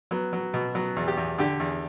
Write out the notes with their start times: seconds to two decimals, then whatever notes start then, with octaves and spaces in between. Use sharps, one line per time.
0.11 F#3 B3
0.33 F#3
0.54 B2
0.75 F#3 B3
0.96 E2
1.08 G4
1.17 E2
1.38 D3 G4
1.60 E2